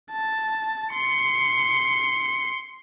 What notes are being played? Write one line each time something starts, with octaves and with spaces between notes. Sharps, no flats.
A5
C6 C#7